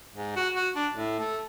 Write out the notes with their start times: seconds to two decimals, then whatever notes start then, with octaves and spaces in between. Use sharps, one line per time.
0.15 G#2
0.36 F#4
0.55 F#4
0.76 D4
0.94 A2
1.19 A3